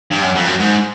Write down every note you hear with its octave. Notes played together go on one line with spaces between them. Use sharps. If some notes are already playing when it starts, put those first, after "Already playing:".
G2
F#2
F2
F#2
G#2